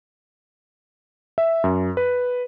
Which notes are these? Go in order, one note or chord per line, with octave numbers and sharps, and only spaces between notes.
E5
F#2
B4